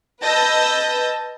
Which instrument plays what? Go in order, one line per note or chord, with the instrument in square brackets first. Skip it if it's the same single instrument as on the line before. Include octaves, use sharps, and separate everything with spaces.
[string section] B4 D#5 A5 E6 G6 A#6